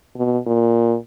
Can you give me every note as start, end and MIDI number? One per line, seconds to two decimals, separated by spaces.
0.16 0.38 47
0.46 0.96 46